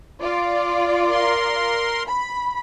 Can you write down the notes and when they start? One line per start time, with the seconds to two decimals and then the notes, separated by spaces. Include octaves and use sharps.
0.22 F4 D5
1.06 A#4 C6
2.07 B5